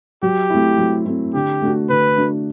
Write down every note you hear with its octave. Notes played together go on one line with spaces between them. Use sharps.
F#3 G4
A3 C4 E4
F#3
A3 C4 E4
D3 G4
A3 D4 F#4
D3 B4
A3 D4 F#4